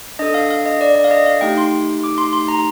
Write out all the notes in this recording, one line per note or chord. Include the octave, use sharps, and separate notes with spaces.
D4 A4 D#5
F5
F5
D#5
D5
D5
F5
D#5
F5
A3 D#4 G4 G5
C6
D6
C6
C6
A#5